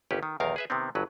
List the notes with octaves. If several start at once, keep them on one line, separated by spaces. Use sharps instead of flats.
G1 D#2 C#4 G4 B4
D#3
B1 E2 D#3 A#4 F5
G#4 B4 E5
C3 D#3 B3 C4
G1 G2 F#3 B4